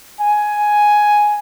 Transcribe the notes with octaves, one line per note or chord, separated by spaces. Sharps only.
G#5